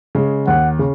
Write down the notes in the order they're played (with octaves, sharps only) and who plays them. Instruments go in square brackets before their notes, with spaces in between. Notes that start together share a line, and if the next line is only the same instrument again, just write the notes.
[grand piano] C#3 G#3
[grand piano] D#2 [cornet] F#5
[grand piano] C#3